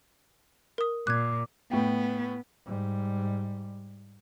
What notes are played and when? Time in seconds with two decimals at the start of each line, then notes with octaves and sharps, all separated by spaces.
0.78 A#4 D#6
1.07 A#2 D6 F#6 G#6
1.71 A2 B3 G5
2.65 G#2 G3